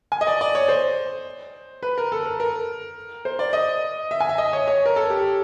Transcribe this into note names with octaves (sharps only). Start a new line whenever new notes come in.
G#5
D#5
D5
D5
C#5
C5
B4
A#4
A4
A#4
A#4
C5
D5
D#5
E5
G#5
E5
D#5
C#5
C#5
A#4
A4
G4